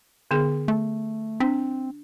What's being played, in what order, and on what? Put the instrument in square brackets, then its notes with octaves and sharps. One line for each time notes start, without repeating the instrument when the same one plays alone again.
[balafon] D3 B3 G#4
[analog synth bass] A3
[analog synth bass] C4 [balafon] D4